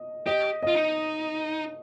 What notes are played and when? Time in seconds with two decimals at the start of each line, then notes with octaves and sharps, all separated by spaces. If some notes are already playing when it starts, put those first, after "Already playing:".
Already playing: D#5
0.26 G4 D#5
0.63 F4 D#5
0.75 D#4